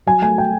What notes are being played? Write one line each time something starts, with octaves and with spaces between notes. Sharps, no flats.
F#3 G#5
A3 G#5
G5